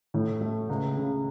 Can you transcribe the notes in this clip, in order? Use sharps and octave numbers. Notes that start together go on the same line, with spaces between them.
A2
A3
C#2
C#3